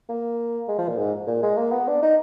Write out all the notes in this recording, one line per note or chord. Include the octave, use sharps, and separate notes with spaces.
A#3
G#3
F3
A#2
G#2
A#2
G#3
A#3
B3
D4
D#4